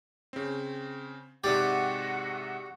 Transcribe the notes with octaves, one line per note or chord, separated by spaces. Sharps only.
C#3 C4
G#2 C3 F#4 G4 D5 F#5